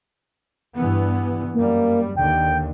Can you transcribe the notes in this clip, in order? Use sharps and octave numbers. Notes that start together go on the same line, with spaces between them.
G2 E3 B3
F#2 G3 A#3
D#2 D3 G5